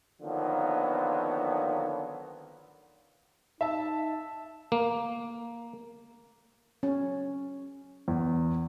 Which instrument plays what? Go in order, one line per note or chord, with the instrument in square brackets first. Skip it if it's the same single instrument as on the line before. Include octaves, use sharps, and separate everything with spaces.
[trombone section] D3 D#3 F3 F#3 A#3 B3
[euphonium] D#4 [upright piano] E5 A5
[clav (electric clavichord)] A#3
[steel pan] C#4
[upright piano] E2